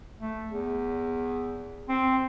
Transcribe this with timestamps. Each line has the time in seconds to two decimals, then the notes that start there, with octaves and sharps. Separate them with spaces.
0.18 A3
0.48 E2
1.89 C4